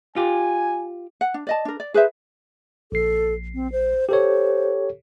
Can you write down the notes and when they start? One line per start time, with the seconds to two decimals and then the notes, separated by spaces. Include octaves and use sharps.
0.16 F4 G4 G#5
1.21 F#5
1.34 D4
1.47 D5 D#5 A5
1.65 D4 A#4
1.80 D5
1.94 G#4 B4 C5 E5
2.92 A#1 A4 C7
3.54 C4
3.72 C5
4.09 G4 A4 C5 C#5